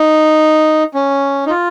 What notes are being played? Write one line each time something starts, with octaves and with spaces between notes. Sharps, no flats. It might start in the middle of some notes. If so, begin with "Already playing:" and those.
Already playing: D#4
C#4
D#4
F4